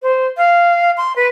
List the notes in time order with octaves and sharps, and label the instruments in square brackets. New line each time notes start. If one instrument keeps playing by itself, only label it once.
[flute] C5
F5
C6
B4